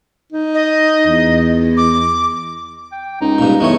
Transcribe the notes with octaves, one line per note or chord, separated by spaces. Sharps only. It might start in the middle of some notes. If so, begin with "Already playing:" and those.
D#4
D#5
E2
D6
G5
C#2 D#4
G2 A#2
E2 G#3 A3 C#5